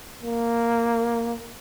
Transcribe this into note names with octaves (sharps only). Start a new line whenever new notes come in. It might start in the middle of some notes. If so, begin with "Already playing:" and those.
A#3